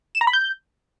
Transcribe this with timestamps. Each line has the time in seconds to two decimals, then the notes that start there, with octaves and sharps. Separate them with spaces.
0.15 E7
0.21 A#5
0.27 B5
0.33 G6